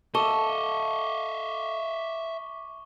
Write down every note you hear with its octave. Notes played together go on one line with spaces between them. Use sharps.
A4 D#5 E5 C#6 D6 G7